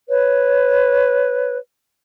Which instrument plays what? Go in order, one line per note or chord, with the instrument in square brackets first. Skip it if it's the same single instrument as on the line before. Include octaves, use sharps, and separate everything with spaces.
[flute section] B4 C#5